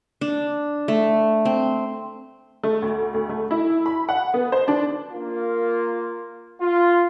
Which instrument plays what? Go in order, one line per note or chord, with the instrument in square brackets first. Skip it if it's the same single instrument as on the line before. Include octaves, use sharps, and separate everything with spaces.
[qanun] D4
A3
C4
[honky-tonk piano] A3
D2
D2
A3
E4
B5
F#5
B3
C5
D4
[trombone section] A#3 F4
F4